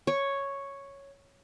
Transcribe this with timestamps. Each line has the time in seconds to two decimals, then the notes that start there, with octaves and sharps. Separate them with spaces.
0.07 C#5